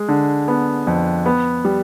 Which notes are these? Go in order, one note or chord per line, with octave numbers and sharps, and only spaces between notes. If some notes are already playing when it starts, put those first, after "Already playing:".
Already playing: G#3
D3
B3
F2
B3
G3